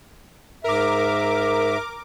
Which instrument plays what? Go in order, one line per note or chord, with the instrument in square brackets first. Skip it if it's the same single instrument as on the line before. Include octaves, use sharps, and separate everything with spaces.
[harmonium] G#2 E5 [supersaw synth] A#4 D6